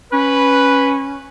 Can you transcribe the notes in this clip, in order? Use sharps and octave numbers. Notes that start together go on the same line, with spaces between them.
C#4 B4